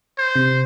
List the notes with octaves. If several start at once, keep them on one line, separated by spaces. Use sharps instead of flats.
C5
C3